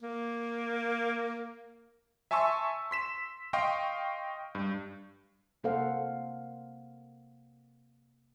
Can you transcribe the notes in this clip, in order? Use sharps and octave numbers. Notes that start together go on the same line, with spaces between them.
A#3
E5 G#5 A5 C6 C#6 E6
C6 B6 E7
D#5 F5 G5 C6 C#6
G2
C3 A#3 A4 C5 F5 F#5